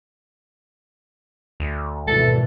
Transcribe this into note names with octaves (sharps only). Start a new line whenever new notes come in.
D2
G#1 B2 E3 A4